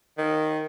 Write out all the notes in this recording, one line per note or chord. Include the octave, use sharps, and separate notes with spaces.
D#3